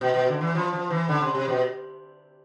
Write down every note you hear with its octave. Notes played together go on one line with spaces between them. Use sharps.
B2
B2
D3
E3
F3
F3
E3
D3
C3
C3
B2